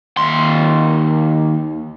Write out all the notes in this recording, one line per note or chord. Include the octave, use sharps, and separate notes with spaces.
D#2 C6